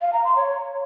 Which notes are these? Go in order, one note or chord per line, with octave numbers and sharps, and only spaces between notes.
F5
A#5
C6
C#5